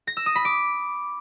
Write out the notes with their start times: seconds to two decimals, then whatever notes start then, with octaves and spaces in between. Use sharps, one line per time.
0.07 A#6
0.17 E6
0.26 D#6
0.35 B5
0.45 D6